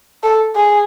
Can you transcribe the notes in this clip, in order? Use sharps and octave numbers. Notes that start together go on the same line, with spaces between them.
A4
G#4